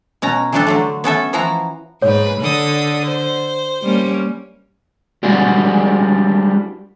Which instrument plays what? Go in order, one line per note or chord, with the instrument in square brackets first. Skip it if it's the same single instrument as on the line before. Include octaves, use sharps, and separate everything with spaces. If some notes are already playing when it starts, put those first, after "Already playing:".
[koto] B2 C#4 A#5
E3 F3 G3 D4 G4 A4
D3 F#3 A3
B3 C#4 A4 E5
E3 F3 E4 F#4 A#5
[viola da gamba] G#2 B4 [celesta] C#5
[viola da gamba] D3 [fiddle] A4 D#6
[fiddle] C5
[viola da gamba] G3 A#3 C#4
[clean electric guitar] G3 G#3 D4 E4 F#4 G#4